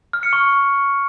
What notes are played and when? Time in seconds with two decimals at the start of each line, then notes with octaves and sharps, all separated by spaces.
0.13 F6
0.23 C#7
0.33 C#6